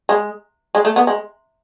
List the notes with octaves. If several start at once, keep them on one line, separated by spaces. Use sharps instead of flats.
G#3
G#3
A3
B3
G#3